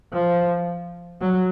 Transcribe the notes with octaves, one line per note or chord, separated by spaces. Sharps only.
F3
F#3